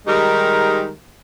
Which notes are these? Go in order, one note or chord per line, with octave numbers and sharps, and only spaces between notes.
D#3 G3 G#3 D#4 G4 A#4